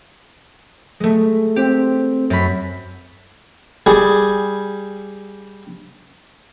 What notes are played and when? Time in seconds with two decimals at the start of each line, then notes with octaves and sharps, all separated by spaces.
1.00 G#3 A3
1.56 C4 G4
2.30 F#2 B5
3.86 G3 G#4